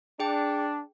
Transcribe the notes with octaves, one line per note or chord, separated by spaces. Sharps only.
D4 G#4 G5